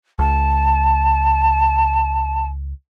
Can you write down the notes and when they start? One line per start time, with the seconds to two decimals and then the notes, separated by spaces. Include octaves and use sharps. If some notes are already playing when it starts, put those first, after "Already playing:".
0.19 C#2 A5